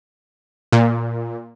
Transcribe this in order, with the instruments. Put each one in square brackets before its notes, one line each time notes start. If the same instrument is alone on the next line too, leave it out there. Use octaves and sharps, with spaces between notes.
[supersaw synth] A#2